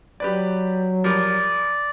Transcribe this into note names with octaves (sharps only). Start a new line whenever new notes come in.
F#3 G4 B4 D5
F3 G3 A#4 D5